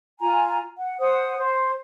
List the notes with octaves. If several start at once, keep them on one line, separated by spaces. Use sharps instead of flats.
F4 G#5 A#5
F#5
C5 F#5 D#6
C5